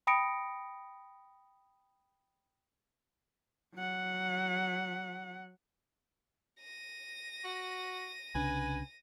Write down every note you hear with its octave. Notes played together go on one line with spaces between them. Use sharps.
G5 B5 D#6 A#6 C#7 D7
F#3 F#5
A#6 D#7
F#4
C2 C#3 D4 B4 G#5